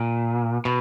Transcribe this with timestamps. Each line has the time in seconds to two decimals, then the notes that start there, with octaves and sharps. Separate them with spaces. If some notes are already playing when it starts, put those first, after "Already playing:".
Already playing: A#2
0.65 B2